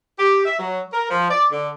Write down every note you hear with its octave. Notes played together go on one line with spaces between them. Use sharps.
G4
E5
F#3
A#4
F3
D5
D3